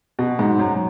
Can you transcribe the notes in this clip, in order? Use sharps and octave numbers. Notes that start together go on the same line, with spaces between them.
B2
G#2
F#2